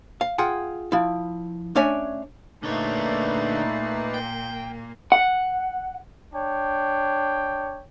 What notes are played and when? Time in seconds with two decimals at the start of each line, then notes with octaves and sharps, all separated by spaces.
0.21 F5
0.38 F4 G#4 F#5 G5
0.92 F3 E4
1.75 A3 C#4 D4 C#5 E5 G#5
2.63 A#2 D3 A3 A#3 D#4 B4 C#5 D5
4.14 G5
5.12 F#5
6.34 D4 C#5 G5